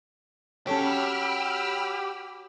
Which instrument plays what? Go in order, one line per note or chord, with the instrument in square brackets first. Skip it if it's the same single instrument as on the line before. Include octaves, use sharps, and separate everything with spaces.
[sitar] F#3 [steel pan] C#4 A4 C#5 [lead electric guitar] G4 [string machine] B5 E6 F6